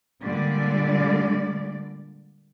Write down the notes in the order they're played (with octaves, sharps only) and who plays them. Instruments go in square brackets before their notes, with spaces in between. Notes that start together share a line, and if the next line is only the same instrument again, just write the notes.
[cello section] A#2 D3 G3 G#3 D5